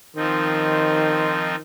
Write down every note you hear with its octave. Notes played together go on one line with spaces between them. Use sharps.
D#3 F3 C4 D#4